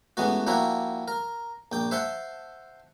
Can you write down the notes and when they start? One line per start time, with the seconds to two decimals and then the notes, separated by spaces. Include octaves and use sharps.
0.17 A1 E3 G#3 B3 F#4
0.47 F3 G3 A#3 E4 F#4
1.08 A#4
1.72 A#1 G5 D6
1.91 C5 E5 F#5 A5 C6